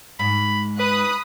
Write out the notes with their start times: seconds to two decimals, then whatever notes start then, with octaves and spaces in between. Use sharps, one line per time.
0.19 G#2 B5
0.80 B4 B5 D#6 F#6